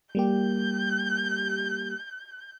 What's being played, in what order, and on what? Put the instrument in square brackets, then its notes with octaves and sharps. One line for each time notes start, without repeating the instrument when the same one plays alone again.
[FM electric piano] G3 A#3 G4 [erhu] G6